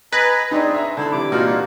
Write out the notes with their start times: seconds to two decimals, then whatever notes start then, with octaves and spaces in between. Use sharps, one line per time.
0.12 B4 D#5 G#5 A#5 A6
0.51 C4 D4 D#4 G#4
0.73 D#5 E5 A#5
0.97 D3 E4 C5 A5 B5
1.12 C3 E3 D4 D6
1.32 A#2 A#3 D#4 F4 F#4